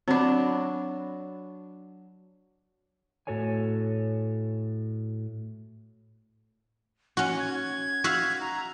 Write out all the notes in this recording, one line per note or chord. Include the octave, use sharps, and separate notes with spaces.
F#3 C4 D4 B5
A2 F#4 A4 C#5 G#5
C#4 F#4 F#5
G#6
F#4 E5 F5
A#5